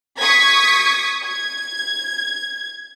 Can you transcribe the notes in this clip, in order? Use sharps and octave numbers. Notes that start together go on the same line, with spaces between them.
C#6 D#6 G#6 B6
G#6